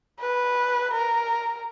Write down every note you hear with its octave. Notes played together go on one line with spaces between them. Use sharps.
B4
A#4